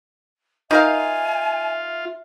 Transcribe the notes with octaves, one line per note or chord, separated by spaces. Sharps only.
D#4 F4 A#4 E5 F5 G#5